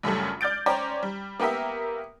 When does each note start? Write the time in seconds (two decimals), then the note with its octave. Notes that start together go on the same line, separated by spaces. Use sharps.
0.03 A#1 F#2 C#3 G3 A3
0.41 D5 F6 G6 A6 D7
0.66 C#4 C5 D5 G5 A#5
1.03 G3
1.40 A#3 B3 G4 A#4 E5